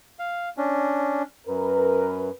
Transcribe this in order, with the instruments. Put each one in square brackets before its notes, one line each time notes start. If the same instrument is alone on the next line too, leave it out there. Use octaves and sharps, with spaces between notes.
[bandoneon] F5
C#4 D4
[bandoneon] F#2 [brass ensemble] A#4 B4